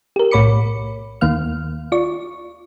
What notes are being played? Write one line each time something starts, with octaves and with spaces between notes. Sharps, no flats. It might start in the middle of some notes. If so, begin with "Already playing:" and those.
G4 A#4
B1 A2 C#5 B5 D6 C#7
D#2 D#3 A#3 F5 F6
F4 D5 C#6